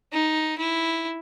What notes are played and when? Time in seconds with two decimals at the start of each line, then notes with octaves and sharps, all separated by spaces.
0.13 D#4
0.58 E4